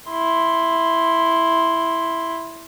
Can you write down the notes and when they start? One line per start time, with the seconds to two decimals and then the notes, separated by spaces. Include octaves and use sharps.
0.10 E4 C6